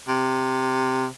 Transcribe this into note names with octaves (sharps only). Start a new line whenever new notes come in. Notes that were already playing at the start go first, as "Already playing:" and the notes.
C3